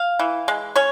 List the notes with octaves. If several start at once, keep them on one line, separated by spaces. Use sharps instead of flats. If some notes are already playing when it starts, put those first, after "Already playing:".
Already playing: F5
E3
G#3
C#4 C#5